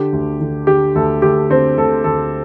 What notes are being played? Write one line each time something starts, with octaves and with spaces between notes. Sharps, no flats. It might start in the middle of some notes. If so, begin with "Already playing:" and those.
Already playing: D3 G4
D2
D3
D3 G4
D2 A4
D2 G4
D3 C4
D2 A4
D2 A4